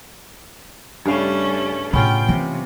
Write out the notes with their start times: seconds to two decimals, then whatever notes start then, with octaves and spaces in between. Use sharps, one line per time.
1.05 G2 C#3 G3 A3 C#4 F5
1.93 A2 C#3 B3 C#4 F4 G5
2.29 C3 E3 A3